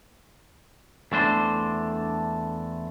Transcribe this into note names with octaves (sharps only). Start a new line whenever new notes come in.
E2 A3 D4 C5